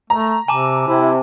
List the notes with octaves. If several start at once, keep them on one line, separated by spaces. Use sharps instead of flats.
A3 A#5
C3 G#5 A5 D6
C3 E4